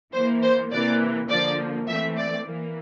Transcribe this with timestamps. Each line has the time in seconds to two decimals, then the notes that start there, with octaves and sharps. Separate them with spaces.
0.13 E3 A#3 C5
0.43 C5
0.71 C3 E3 A#3 D5
1.30 D3 F3 A#3 D5
1.88 E3 A3 C4 E5
2.17 D5
2.46 E3 A#3